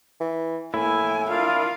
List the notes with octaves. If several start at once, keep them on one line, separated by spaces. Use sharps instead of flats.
E3
A2 A#3 E4 G#5
D4 F4 A#4 F5